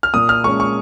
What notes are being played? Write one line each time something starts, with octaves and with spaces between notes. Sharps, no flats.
F6
A#2 D#6
F6
G#3 C#4 C#6
C#6